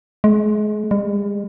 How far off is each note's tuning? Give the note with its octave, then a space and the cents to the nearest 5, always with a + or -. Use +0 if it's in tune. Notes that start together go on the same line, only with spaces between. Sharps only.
G#3 +30
G#3 -45